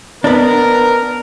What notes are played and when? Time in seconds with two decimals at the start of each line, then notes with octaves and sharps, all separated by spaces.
0.24 B3 D4 A#4